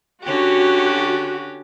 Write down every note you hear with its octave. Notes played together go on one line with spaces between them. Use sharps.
D3 C#4 F#4 G4